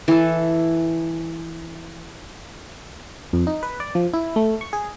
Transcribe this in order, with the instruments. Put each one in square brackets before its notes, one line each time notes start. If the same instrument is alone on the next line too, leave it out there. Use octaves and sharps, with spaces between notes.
[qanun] E3 A4
[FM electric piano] F2
D#4
B4
D5
F3
E4
A3
C#6
G#4